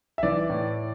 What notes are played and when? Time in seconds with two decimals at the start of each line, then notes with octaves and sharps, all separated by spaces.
0.18 E5
0.23 E3 D5
0.50 A2